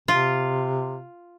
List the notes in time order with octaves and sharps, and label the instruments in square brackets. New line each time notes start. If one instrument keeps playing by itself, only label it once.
[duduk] C3 [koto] F4